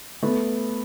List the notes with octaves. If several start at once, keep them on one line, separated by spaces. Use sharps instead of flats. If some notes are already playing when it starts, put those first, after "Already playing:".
A3 B3